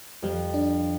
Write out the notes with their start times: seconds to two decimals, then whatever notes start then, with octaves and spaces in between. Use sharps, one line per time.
0.22 F2 F3 G3
0.54 D4